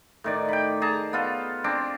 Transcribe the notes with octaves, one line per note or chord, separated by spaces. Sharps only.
A2 D#3 D5
G5 B5
G#4 A5 A#5
B3 F4 A4
C4 D4 D6